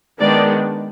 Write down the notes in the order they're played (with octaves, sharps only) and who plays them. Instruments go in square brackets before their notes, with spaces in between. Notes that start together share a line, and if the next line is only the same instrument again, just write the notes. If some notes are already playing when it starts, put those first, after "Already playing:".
[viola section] D#3 G#3 B3 D4 D5